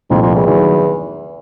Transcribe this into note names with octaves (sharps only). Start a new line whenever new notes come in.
C2 F2 A#2 F3 A3 D4
F2
E2
E2 D#3 F#3 A3